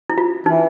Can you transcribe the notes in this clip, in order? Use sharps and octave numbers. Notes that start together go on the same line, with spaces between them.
E4
F4
E3 D#4